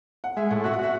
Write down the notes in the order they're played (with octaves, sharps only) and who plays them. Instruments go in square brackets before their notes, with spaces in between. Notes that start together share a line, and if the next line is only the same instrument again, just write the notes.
[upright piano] F#5
[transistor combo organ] G#3 [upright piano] E5
[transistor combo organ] A2 [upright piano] F#5
[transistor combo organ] F#4 [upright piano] E5
[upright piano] F#5
[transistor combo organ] F#4 [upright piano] E5